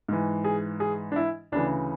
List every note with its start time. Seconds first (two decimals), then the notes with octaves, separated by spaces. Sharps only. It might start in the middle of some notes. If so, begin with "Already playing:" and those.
0.08 G#2 E3
0.44 G#4
0.80 G#4
1.12 D4
1.16 E4
1.52 D2 C#3 E3 D4